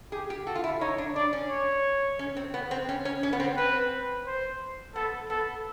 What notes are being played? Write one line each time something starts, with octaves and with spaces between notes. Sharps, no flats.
G4 G#4
G4
F#4 A4
F4
E4
D#4 C#5
D4
D4 D5
C#4
C#5
C#4
C4
B3
C4
C#4
C#4
C#4
B3
C4
C4 B4
C5
B3 A4
B3 A4